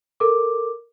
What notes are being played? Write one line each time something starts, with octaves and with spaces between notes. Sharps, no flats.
A4 A#4 D6